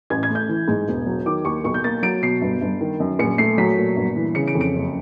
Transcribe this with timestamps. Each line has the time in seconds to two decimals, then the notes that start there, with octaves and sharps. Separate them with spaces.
0.10 A1 G#6
0.23 G#6
0.30 A3
0.35 G6
0.49 E3
0.68 G#2
0.87 E1
1.06 F#3
1.26 D#3 D6
1.45 D#2 C#6
1.64 B1 C#6
1.74 G6
1.84 A#3 A6
2.03 F#3 D7
2.22 B2 C7
2.42 G1
2.61 G1
2.81 D#3
3.00 F#2
3.19 A#1 C#7
3.38 A3 C7
3.58 F#3 B6
3.77 A#2
3.96 G1
4.16 E3
4.35 C#3 C#7
4.48 D7
4.55 F2
4.61 D7
4.74 F#1